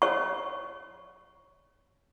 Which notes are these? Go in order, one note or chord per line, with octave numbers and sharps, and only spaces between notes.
C#5 C#6